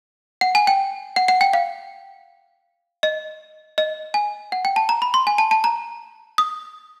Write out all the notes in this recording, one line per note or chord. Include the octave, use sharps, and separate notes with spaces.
F#5
G#5
G5
F#5
F#5
G5
F5
D#5
D#5
G#5
F#5
G5
A5
A#5
B5
C6
G#5
A5
A5
A#5
D#6